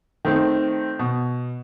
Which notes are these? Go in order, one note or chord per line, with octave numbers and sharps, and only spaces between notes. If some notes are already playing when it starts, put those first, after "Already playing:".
D#3 A3 C4
B2